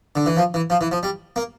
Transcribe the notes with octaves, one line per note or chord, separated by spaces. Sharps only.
D3
E3
F3
E3
F3
E3
F3
G3
A#3